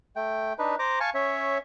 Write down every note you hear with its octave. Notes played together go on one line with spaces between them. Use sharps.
A3 G5
D4 D#4 B4
C5 A#5 D6
F5 G#5 A5 C#6
C#4 C#5 E5